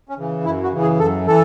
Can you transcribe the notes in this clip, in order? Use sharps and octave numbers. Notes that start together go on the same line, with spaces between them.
C#4
C#3 E3
F#2 E4
F#4
C#3 E3
G#4
F#2 A4
E3 A4